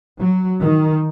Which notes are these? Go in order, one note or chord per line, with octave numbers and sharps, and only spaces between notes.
F#3
D#3